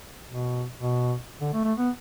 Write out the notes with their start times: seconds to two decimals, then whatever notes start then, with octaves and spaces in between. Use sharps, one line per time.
0.29 B2
0.78 B2
1.41 D3
1.53 A3
1.64 A3
1.78 B3